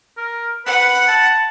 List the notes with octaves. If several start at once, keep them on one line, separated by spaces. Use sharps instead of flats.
A#4
B4 F#5 B5
A5